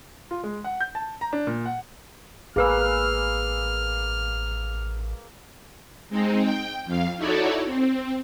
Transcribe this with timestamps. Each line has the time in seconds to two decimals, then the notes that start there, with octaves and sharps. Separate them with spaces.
0.31 F4
0.44 G#3
0.64 F#5
0.81 G6
0.95 A5
1.21 A#5
1.33 D4
1.47 A#2
1.66 F#5
2.56 A1 A#3 G#4 B4 F5 E6 F6
6.10 G#3 C4 D#4
6.42 G5
6.85 F2 F5
7.17 D#4 E4 F#4 A4 C#5 D5
7.65 C4